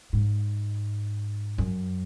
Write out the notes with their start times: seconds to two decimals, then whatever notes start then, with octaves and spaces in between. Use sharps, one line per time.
0.13 G#2
1.58 F#2